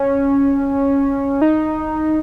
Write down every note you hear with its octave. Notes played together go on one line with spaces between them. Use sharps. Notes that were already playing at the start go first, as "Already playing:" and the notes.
Already playing: C#4
D#4